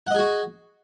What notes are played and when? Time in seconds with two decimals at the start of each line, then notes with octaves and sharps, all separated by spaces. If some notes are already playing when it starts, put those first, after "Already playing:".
0.07 F#5
0.11 D#5
0.15 G#4
0.19 F#4